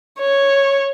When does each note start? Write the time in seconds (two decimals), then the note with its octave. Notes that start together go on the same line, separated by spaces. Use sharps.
0.19 C#5